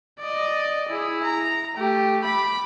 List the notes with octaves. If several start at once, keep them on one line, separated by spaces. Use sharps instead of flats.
D5 D#5
E4 G#4
A#5
A3 G4
B5 D6